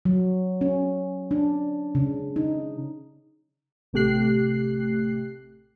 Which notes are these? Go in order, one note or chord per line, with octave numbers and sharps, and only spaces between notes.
F#3
C#4
D4
C#3
D#4
A1 C3 A3 G4 F#6 C7